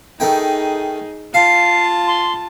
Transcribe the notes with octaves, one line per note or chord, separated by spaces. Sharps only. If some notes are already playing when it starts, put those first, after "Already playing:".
D#3 A3 D#4 G#4 G5
F4 F5 A5 C7
C6